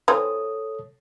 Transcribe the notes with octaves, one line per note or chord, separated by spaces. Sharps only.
E3 C4 F4 A4 C#5 D#6